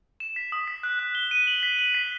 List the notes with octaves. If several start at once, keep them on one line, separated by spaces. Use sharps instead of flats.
E7
B6
D#6
B6
F#6
F#6
G7
D#7
F#7
B6
F#7
B6